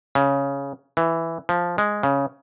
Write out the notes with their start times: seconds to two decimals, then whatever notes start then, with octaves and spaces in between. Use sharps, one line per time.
0.15 C#3
0.97 E3
1.49 F3
1.78 G#3
2.03 C#3